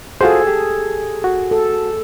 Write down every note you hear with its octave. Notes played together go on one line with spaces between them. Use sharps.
F4 F#4 G#4 A4 C5
G4
F#4
A4